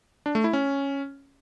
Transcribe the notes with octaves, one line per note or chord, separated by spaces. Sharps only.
D4
A3
E4
C#4